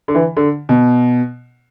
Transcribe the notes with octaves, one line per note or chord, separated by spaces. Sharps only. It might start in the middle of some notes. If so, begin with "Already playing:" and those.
D3
E3
D3
B2